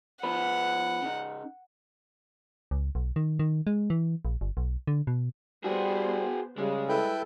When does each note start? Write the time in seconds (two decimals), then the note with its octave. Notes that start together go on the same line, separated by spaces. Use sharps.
0.23 F3 B3 B4 F#5
1.02 C#3 D#4
2.71 C#2
2.95 B1
3.16 D#3
3.39 D#3
3.67 G#3
3.90 E3
4.25 A#1
4.41 G1
4.57 B1
4.87 D3
5.07 B2
5.64 G3 B3 F#4 G#4 C5
6.58 C#3 G3 G#3
6.89 E4 A4 B4 G5